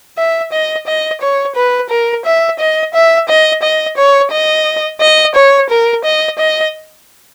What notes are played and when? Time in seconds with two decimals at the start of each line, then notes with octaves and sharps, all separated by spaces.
0.17 E5
0.52 D#5
0.87 D#5
1.21 C#5
1.56 B4
1.89 A#4
2.25 E5
2.59 D#5
2.94 E5
3.28 D#5
3.62 D#5
3.97 C#5
4.32 D#5
5.01 D#5
5.35 C#5
5.69 A#4
6.05 D#5
6.38 D#5